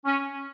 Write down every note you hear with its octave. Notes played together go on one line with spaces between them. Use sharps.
C#4